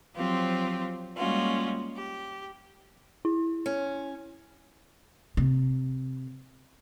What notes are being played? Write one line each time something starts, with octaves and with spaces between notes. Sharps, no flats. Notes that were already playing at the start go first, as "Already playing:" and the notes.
F3 F#3 C4 F4 G4
G3 G#3 A#3 C#4 F4 F#4
G4
E4
C#4
C3